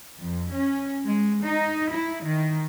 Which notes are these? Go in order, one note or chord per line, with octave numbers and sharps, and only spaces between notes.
F2
C#4
G#3
D#4
E4
D#3